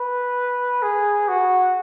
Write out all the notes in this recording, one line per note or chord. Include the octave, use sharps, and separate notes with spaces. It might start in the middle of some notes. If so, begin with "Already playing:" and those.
Already playing: B4
G#4
F#4